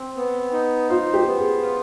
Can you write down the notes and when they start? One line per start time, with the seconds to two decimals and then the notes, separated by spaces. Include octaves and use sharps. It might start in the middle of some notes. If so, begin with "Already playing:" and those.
Already playing: C4
0.17 B3
0.53 D#4
0.89 F4 C5
1.14 G4
1.26 B3
1.38 G#4
1.62 F4